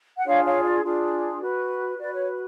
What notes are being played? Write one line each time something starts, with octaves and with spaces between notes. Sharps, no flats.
F#5
D4 F4 G#4 C#5 F5
C#5 F5
D5
D4 F4 G#4
F#4 B4
F#4 B4 D5
C#5